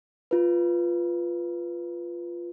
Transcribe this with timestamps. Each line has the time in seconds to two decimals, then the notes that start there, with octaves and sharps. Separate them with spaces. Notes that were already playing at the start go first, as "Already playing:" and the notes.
0.31 F4 B4